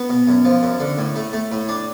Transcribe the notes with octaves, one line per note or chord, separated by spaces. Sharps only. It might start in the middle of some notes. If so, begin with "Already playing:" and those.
Already playing: B3
B2
F#2
F3
F#2
D3
A2
A3
A3
A2
D4